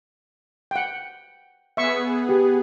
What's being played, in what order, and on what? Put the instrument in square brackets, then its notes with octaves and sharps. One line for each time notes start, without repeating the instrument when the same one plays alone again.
[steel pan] F#5 G5
[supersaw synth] B3 G#4 [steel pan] E5 C#6
[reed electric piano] G4